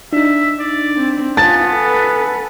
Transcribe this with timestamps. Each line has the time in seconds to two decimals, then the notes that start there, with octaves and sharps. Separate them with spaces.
0.13 D4 D#4 E5
0.60 D5
0.96 C4
1.37 B3 F4 G#5 A5 A6
1.74 A4 B4